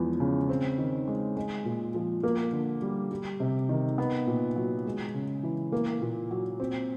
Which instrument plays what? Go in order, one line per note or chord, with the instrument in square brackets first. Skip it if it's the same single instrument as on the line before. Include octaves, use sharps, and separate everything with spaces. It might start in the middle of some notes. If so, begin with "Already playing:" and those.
Already playing: [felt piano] E2 F3 G#3
C#3
C4
D#3
G#3
G#3
A#2
F3
A#3
D3
G3
G3
C3
D#3
B3
A#2
F#3
G#3
C#3
E3
A#3
A#2
F#3
C4